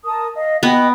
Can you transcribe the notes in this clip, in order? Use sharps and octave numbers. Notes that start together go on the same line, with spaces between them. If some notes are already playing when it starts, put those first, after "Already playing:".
A#4 A5 D#6
D#5 F5
B3 F#4 D#5 G5